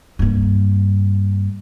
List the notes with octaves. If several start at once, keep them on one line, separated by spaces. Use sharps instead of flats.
G2 A#3